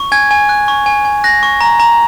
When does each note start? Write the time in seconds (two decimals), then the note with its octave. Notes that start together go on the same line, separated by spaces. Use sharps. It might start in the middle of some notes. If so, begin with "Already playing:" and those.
Already playing: C#6
0.12 G#5 G#6
0.31 G#5
0.49 F#6
0.68 C#6
0.86 G#5
1.05 G#5
1.24 F#6 A#6
1.43 C#6
1.61 A#5
1.80 A#5